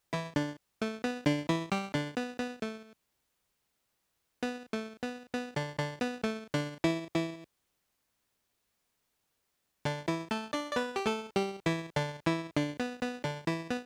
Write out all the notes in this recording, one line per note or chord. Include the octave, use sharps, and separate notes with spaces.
E3 E4
D3 D4
A3
B3
D3 D4
E3 E4
G3 G4
D3 D4
B3
B3
A3
B3
A3
B3
B3
D3 D4
D3 D4
B3
A3
D3 D4
E3 E4
E3 E4
D3 D4
E3 E4
A3 A4
D4 D5
D5
B3 B4
G4
A3 A4
G3 G4
E3 E4
D3 D4
E3 E4
D3 D4
B3
B3
D3 D4
E3 E4
B3